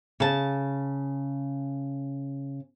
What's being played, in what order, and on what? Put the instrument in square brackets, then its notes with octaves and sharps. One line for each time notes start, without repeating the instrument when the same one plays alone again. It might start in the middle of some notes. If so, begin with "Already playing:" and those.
[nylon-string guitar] C#3 A5